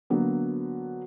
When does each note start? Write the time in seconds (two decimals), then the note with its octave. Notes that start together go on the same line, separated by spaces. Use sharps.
0.10 D3 F#3 A#3 B3